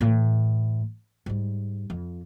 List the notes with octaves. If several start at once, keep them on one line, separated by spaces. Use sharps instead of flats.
A2 E3
G#2 G3
F2